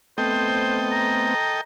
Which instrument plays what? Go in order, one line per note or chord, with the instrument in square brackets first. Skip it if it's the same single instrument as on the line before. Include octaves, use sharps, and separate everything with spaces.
[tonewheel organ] A3 B3 C4 [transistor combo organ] A4 D#5 G5 [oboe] C5
[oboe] A#5